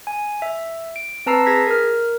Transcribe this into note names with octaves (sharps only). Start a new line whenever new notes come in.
G#5
E5
D7
C4 B4 A5 A#5 E6 C7
G#4 G#6 A#6 B6
A#4 F6